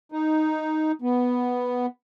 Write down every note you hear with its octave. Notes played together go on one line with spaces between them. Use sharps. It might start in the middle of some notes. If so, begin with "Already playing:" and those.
D#4
B3